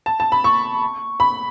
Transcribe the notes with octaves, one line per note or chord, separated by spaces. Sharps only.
A5
A5
B5
C#6
B5